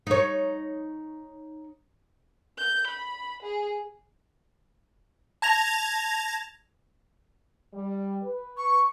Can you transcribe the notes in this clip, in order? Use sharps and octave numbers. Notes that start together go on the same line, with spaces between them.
D#4 C#5
G6
B5
G#4
A5 G#6 A#6 F7
G3
B4
C#6